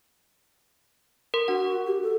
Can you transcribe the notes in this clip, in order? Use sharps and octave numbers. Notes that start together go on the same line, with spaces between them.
A#4 C6
D4 F#4 F#5
G4
A4